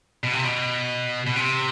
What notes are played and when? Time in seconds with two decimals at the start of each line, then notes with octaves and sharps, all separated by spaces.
0.24 B2
0.33 C3
0.44 B2
1.26 B2
1.36 C3